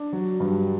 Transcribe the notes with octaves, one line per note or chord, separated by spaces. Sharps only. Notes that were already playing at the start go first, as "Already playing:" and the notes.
Already playing: D4
F#3
G2